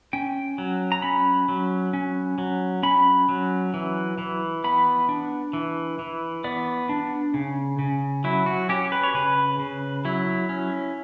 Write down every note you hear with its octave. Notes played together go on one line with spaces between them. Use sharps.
C#4 G5
F#3
A#5
C#4 B5
F#3
C#4
F#3
C#4 B5
F#3
E3
E3
B3 B5
D4
E3
E3
B3 D5
D4
C#3
C#3
F#3 E4
F#4
C#4 G4
B4
C#5
C#3 B4
C#3
F#3 E4
C#4